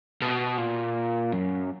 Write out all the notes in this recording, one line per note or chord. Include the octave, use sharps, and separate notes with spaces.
B2
A#2
F#2